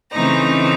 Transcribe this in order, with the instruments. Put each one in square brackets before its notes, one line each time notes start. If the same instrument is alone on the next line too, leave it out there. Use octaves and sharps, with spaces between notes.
[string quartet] C#3 E3 A3 C4 D#4 A#5